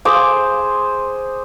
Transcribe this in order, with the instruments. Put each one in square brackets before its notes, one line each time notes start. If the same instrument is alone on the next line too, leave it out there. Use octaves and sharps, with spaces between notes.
[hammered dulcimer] G#4 C5 D6